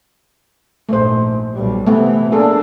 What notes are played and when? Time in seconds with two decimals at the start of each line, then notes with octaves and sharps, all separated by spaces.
0.89 A#1 G#2 A3 C5
1.54 B1 G3
1.87 C3 E3 A3 B3
2.32 A#3 D4 G#4 A4